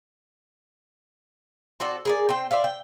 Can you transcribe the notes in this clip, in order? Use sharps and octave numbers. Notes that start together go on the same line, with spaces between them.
C4 F#4 A4 D5
G#4 A#4 D5
C4 C5 G5
C5 D5 E5 F5
G5